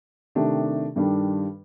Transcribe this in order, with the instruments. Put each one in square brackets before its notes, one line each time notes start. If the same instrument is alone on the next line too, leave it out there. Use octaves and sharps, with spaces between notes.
[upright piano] C3 D#3 A3 D4 G4
G2 D#3 G3 D4 A4